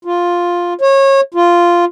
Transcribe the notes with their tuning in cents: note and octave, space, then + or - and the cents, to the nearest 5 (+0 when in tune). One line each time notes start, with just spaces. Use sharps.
F4 +5
C#5 -25
F4 -5